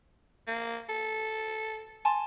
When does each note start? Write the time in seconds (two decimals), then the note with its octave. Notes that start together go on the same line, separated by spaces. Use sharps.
0.47 A#3
0.89 A4
2.05 G#5 A5 C6